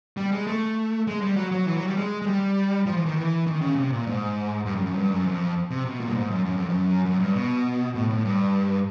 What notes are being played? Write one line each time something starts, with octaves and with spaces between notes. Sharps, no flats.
G3
G#3
A3
G#3
G3
F#3
F#3
E3
F#3
G3
G#3
G#3
G3
F3
E3
D#3
E3
D#3
C#3
C3
A#2
G#2
G2
F#2
F#2
G2
F#2
F2
C3
B2
A#2
G2
G#2
F#2
F#2
F2
F#2
F#2
G2
B2
A2
A2
G2